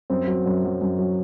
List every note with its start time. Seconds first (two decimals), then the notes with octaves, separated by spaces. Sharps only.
0.10 F#2 C4
0.28 F#3
0.46 F#2
0.64 F#3
0.82 F#2
0.99 F#3